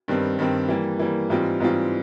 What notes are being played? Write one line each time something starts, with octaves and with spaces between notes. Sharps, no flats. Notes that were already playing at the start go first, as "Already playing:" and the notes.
G2 D#3 G3 C4
G2 D#3 G3 C4
E3 G3 A#3
E3 G3 A#3
G#2 E3 G3 C4 F4
G#2 E3 G3 C4 F4